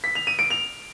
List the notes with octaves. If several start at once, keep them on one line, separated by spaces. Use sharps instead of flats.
B6
F7
D#7
D7
F7